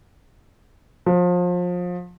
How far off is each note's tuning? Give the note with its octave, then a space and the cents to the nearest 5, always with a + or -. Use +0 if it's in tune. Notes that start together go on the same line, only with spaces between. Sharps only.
F3 +30